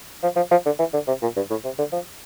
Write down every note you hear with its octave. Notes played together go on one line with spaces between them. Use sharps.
F3
F3
F3
D3
E3
D3
C3
A#2
G2
A2
C3
D3
F3